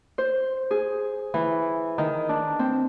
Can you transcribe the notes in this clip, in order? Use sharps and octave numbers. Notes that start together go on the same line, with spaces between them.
C5
G#4
E3
D#3
D4
C4